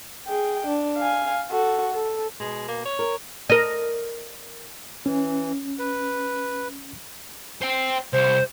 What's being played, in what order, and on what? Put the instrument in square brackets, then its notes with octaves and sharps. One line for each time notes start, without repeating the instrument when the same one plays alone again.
[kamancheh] G#4 G5
D4
F5 G#5
F#4 A4
A4
[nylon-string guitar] B2 [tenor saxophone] G#3
[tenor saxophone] A#3
C#5
[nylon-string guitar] A#4
[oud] A#4 D#5
[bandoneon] E3 [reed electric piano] C#4
[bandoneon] B4
[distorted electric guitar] C5 G5
[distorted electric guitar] C2 [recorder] C5